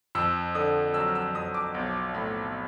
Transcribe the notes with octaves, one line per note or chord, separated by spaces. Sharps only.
F2 E6
D3 D#6
F#3 E6
F6
E6
F2 D#6
D6
B1
A2